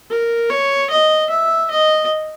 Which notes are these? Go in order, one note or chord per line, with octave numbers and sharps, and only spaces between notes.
A#4
C#5
D#5
E5
D#5